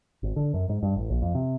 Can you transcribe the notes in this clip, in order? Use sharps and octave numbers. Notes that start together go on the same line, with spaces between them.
G#1
D3
F#2
G#2
G2
A1
A#1
F2
C3